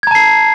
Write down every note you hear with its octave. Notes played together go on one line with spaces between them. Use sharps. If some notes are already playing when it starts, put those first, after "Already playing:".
A5 A#5 G#6 C7